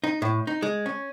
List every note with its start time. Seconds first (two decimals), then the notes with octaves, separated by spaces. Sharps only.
0.04 D#4
0.22 A2
0.47 D#4
0.62 G#3
0.86 C#4